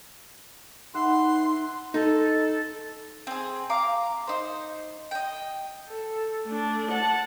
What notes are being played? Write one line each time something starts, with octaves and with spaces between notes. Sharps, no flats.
D#4 B4 E5 F#5 C6
D#4 A4
C4 G#4
F5 A#5 D6
D#4 C5
D#5 G5
A4
A3 D4
F#5 A5